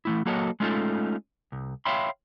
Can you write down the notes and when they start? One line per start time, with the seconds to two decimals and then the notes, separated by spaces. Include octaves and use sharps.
0.05 E3 A3 E4
0.26 F#3 A#3 F#4 A4 C#5 D#5
0.60 G#3 A3 C#4 D#4 F4 A4
1.52 C2
1.85 C#5 E5 F5 G5 B5 C6